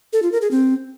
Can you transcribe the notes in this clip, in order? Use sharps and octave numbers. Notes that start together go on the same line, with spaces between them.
A4
F4
A#4
G#4
C4